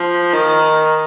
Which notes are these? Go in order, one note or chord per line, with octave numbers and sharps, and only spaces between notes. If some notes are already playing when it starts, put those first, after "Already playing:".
Already playing: F3
D#3